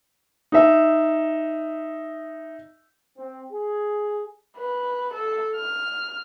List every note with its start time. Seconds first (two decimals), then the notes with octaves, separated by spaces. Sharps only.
0.52 D#4 E5
3.17 C4
3.52 G#4
4.57 B4
5.14 A4
5.56 F6